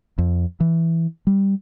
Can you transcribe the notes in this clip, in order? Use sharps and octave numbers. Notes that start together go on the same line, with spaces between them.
F2
E3
G3